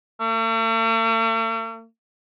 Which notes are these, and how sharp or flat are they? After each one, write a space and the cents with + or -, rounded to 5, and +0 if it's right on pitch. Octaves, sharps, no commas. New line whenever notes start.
A3 +45